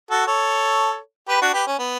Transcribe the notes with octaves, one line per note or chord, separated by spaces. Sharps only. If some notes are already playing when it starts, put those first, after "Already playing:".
F#4 A4
A4 C#5
G4 B4
D4 F#4
G4 B4
C#4
B3